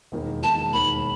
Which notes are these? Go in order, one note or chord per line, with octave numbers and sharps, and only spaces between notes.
E1 D#2 D#3
E1 D#2 D#3 A5
E1 D#2 D#3 B5